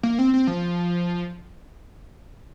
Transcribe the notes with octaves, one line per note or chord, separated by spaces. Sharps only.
A#3
C4
C4
F3